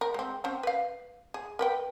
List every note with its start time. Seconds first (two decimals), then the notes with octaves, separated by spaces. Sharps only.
0.01 A#4
0.14 G#3 C4
0.44 C4 C#4 C5
0.63 B4 F5
1.34 G#4
1.59 A#4 B4 G5